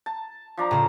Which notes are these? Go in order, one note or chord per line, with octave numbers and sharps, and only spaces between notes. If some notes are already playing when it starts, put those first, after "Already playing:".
A5
F3 D4 A#5
A2 C#3 C5